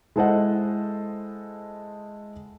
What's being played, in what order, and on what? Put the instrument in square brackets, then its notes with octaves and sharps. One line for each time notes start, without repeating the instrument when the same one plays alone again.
[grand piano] G#3 E4 A4 C5 D#5 F#5